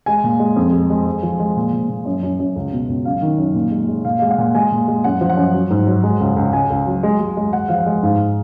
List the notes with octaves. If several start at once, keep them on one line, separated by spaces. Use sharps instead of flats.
G#3 G#5
A#2
G#3
F2
G#3
G#3
G#3
F3
G#3
A#2
A#2
A#2
F#2
F#2
F#2
C#2
B2
C#2
F#2 F5
D#3
F#2
A#2
G#3
G#3
A#2 F5
G#3 F5
F#5
A#2
G#3 G#5
A#2
G#3
F#2 F#5
F3
F#5
F#2
F#3
G#2
F#3
G#3
C#2
C#2
C#2 G#5
C#2
F#3
G#3
G#3
G#3
G#3 F#5
F3 F5
F#5
G#3
G#2 F5